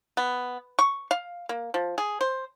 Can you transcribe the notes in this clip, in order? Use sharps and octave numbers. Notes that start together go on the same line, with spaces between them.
B3
C#6
F5
A#3
F3
G#4
C5